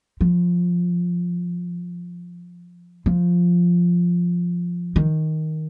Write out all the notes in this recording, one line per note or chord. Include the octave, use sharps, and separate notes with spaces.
F3
F3
D#3